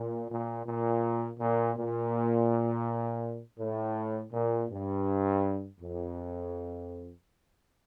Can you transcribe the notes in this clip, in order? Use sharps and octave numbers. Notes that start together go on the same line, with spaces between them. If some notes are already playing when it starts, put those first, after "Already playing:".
Already playing: A#2
A#2
A#2
A#2
A#2
A2
A#2
G2
F2